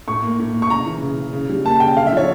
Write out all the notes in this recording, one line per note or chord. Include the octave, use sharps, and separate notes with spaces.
A2 C#6
A#3
A2
A#3
C#6
C#3 A#5
E3
C#3
C#3
C#3
G3
A#3 A5
C#3 G5
D3 F5
E5
F3 C#5